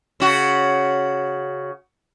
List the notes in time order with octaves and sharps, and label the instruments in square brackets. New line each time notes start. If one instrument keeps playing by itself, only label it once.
[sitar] C#3 F#4